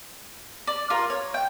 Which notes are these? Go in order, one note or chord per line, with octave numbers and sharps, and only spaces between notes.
D5
F4 A#4
C#5
G5